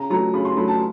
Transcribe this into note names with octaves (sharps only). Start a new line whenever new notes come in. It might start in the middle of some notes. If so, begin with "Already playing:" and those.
Already playing: C#3 A#5
F#3 A3 A#5
C#3 B5
C6
F#3 A3 B5
A5